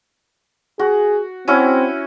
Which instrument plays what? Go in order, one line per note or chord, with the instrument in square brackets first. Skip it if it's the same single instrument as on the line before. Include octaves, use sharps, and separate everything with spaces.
[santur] F#4 [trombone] G#4
[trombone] C4 [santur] C#4 E4 F#4